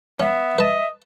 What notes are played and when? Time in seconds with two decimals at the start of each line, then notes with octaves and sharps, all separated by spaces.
0.20 B3 C#4 E5
0.58 B4 D#5 A5